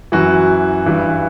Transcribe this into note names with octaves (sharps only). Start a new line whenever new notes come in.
F#2 E3 F#4
G2 E3